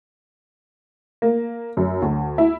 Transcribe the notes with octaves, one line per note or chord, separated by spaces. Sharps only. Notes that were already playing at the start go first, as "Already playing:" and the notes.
A#3
F#2
D2
E4